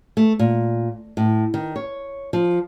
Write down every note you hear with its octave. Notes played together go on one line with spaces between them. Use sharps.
A3
A#2
A2
D#3
C#5
F3